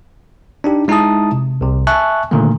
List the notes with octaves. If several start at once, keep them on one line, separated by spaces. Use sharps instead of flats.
D4 D#4 G4
G#3 D#4 E4 E5 A5 D#6
C3
C2 C3
E5 G#5 A5 C#6 F#6
A#2 D3 D#3 A3 A#3